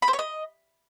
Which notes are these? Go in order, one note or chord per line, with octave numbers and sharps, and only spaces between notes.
B5
C5
C#5
D#5